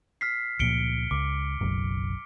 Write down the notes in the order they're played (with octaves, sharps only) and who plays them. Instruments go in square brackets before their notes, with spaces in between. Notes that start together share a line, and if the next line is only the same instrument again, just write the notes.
[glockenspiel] F6 B6 C7
[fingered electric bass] C#2 A#2 F3 [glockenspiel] C#7 D7 G7
[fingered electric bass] C#2 [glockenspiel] D6
[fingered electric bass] F#1 B1 F#2